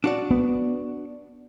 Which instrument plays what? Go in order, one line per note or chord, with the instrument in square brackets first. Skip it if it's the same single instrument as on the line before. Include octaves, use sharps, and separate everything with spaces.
[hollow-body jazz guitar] D4 F#4 D5
[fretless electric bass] B3